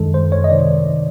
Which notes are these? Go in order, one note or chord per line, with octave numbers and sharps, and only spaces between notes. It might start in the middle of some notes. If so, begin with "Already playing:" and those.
Already playing: F#2 D#3 G#3 A4
C5
C#5
D#5
C3 D#3 D5